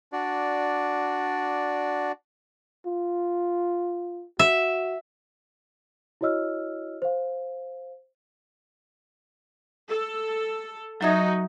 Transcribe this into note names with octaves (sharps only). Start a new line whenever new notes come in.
D4 F#4 D5
F4
F#4 E5
E4 F#4 C#5 D#5 E6 F6
C5 F5
A4
F#3 D#4 F#4 E5 G#6